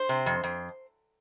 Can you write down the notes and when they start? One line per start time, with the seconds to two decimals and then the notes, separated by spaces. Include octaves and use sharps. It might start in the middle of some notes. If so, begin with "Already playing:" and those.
Already playing: C5
0.09 C3
0.26 F2
0.44 F2